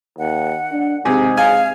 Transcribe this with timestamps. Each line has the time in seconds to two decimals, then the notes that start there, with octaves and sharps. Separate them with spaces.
0.19 D#2 F#5
0.72 D4
1.05 G#2 C3 G#4
1.37 F5 G#5